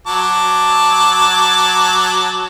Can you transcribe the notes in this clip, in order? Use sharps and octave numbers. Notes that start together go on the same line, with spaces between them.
F#3 A5 D6